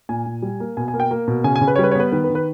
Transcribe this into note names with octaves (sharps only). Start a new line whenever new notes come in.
A#2 G#5
A#2
G3
A#3
B2 G#5
G#5
A#3
G5
A#3
B2
C#3 G#5
G#5
C#3
B4
C#5
G3 B4
C#5
B3 B4
D#3 B4
B4
D#3
B4